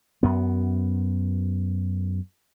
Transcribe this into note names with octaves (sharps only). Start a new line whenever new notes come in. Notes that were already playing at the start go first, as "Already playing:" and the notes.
F#2 B3